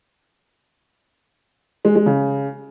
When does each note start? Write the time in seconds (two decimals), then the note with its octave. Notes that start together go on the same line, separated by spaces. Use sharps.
1.85 G#3
1.95 G#3
2.06 C#3